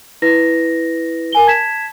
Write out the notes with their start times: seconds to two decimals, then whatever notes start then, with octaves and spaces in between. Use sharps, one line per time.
0.22 E4 B4 A#6
1.32 A#4 G#5 G7
1.47 A5 G#6 B6 E7